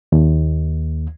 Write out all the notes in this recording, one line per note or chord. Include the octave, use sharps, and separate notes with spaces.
D#2